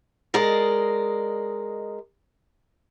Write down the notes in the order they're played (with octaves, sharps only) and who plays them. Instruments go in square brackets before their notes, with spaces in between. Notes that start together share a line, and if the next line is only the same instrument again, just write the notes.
[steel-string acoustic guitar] G#3 A#4 D5 D#5